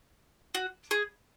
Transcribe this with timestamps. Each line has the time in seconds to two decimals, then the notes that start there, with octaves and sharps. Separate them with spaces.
0.55 F#4
0.91 G#4